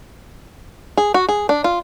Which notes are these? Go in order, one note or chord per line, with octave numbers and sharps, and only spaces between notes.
G#4
F#4
G#4
D4
F4